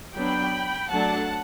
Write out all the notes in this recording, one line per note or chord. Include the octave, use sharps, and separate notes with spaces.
F#3 B3 D4 G5 B5
F#3 A3 D4 F#5 A5